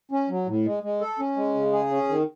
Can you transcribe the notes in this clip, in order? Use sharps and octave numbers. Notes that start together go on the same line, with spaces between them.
C#4
F#3
A2
G#3
G#3
A4
C#4
G#3
C#3
G#4
C#4
D#3